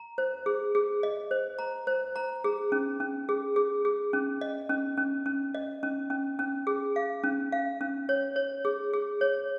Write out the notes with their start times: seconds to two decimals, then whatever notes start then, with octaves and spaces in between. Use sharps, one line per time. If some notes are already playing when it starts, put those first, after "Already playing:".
Already playing: A#5
0.18 C5
0.46 G#4
0.75 G#4
1.03 D#5
1.31 C5
1.59 A#5
1.87 C5
2.16 A#5
2.44 G#4
2.72 C#4
3.00 C#4
3.29 G#4
3.56 G#4
3.85 G#4
4.13 C#4
4.41 D#5
4.69 C#4
4.97 C#4
5.26 C#4
5.55 D#5
5.83 C#4
6.10 C#4
6.39 C#4
6.67 G#4
6.96 F5
7.23 C#4
7.52 F5
7.81 C#4
8.09 C#5
8.36 C#5
8.65 G#4
8.93 G#4
9.21 C#5